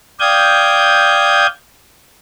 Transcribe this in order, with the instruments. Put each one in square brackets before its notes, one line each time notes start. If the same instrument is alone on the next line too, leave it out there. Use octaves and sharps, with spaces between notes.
[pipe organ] D5 F5 G5 D#6 G6 G#6